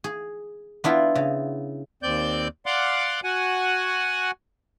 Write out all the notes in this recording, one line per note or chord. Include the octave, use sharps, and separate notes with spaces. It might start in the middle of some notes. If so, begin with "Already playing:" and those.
G#4
B3 D4 E4 F4
C#3
D#2 C4 D5 G6
D5 F5 F#5 C6 D6
F#4 F#5 G#5